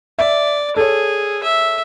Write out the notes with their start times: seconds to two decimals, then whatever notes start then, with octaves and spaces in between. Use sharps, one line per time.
0.19 D5 E5
0.76 G#4 A4 C#5
1.43 E5